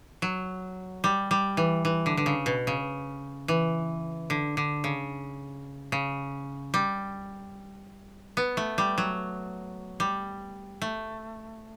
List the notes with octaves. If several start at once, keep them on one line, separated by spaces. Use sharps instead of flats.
F#3
G3
G3
E3
E3
D3
D3
C#3
B2
C#3
E3
D3
D3
C#3
C#3
G3
B3
A3
G3
F#3
G3
A3